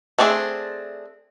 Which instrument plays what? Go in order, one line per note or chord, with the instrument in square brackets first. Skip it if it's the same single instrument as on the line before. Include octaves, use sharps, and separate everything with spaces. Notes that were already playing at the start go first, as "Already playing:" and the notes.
[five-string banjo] A3 C4 D4 G#4